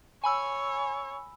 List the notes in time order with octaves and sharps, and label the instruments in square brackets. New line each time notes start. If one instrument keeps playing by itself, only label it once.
[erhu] C#5 [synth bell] G#5 B5 E6